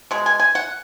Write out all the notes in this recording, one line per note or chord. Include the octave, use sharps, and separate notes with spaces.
B2 G#3
G#5
G#5
F#5